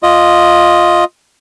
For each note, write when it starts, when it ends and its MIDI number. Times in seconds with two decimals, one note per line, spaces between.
0.03 1.04 65
0.03 1.04 75